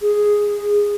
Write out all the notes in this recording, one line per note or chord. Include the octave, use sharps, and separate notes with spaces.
G#4